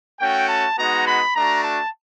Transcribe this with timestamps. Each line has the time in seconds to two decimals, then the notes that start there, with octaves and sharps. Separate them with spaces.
0.20 A3 C#4 F#4 G5
0.49 A5
0.77 G#3 B3 D#4 F#4 A#5
1.06 B5
1.35 A3 D4 F#4 A#5
1.63 A5